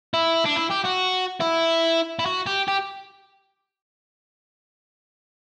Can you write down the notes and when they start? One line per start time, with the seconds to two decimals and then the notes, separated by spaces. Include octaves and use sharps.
0.14 E4
0.45 D4
0.56 E4
0.70 G4
0.84 F#4
1.40 E4
2.19 E4
2.26 F#4
2.46 G4
2.68 G4